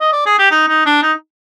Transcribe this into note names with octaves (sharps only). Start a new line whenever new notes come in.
D#5
D5
G#4
G4
D#4
D#4
D4
D#4